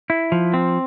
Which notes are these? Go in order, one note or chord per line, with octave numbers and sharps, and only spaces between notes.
E4
F3
C4